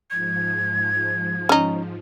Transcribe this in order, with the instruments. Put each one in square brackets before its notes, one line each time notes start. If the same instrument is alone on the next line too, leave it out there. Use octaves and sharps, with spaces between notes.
[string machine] G#2 F3 [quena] G#6
[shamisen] C#4 D#4